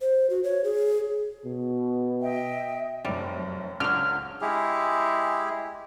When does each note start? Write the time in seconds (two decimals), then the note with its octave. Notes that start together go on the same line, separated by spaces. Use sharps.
0.01 C5
0.30 F#4
0.44 C#5
0.64 G#4
1.45 B2
2.22 D#5 E5 G5
3.05 F1 F#2 G3
3.80 C#2 D3 F#3 F6
4.41 G#3 E4 G4 G#4